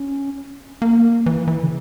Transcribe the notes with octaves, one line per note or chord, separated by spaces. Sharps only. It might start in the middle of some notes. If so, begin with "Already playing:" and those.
Already playing: C#4
A#3
E3
E3
C#3